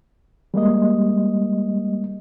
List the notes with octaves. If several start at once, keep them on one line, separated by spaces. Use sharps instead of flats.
G3 G#3 A#3 D#5